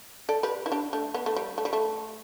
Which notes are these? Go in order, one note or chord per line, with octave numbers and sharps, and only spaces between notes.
A4 D5
G4 B4
E4
D4 G4
A3 D4
B3
A3
G3
A3
G3
A3